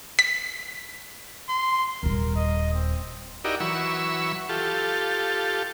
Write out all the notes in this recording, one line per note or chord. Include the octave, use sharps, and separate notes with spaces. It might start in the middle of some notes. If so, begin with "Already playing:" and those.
B6
C6
D#1 G3 A#4
D#5
C4
D#4 E4 F#4 G4 A#4 D5
E3 F#3 B5 C#6 E6
F4 G4 A4